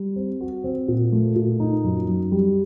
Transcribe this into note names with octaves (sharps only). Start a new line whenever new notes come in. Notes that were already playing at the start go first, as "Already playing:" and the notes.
Already playing: G3
C4
F#4
C4
A#2
A3
A#2
D#4
F#2
F#2
G3